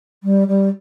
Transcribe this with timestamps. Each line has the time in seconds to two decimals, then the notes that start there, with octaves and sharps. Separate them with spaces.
0.23 G3
0.48 G3